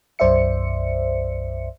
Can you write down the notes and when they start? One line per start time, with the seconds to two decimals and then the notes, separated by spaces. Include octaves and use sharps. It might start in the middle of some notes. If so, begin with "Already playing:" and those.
0.19 B1 F#2 C5 D5 E5 C#7